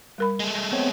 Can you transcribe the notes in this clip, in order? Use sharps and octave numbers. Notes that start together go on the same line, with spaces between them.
G3 A#4 B5
G#3 A3
B3 C4 C#5